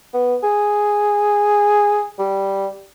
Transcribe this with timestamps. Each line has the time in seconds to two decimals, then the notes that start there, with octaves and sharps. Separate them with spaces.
0.14 B3
0.43 G#4
2.19 G3